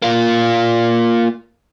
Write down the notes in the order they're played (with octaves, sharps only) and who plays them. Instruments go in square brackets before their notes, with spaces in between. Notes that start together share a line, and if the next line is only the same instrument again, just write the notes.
[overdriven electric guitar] A#3 F4